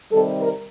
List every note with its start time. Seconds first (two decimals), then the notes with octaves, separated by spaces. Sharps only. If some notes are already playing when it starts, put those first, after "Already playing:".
0.10 C3 D#3 G3 A4
0.40 A#4